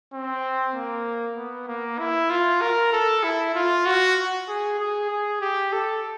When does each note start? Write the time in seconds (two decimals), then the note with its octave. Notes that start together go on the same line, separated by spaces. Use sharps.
0.13 C4
0.74 A#3
1.37 B3
1.68 A#3
1.99 E4
2.30 F4
2.62 A#4
2.93 A4
3.23 E4
3.55 F4
3.86 F#4
4.48 G#4
4.79 G#4
5.10 G#4
5.41 G4
5.73 A4